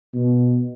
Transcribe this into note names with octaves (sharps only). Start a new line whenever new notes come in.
B2